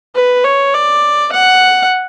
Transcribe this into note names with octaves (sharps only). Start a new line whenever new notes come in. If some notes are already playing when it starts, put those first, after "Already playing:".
B4
C#5
D5
F#5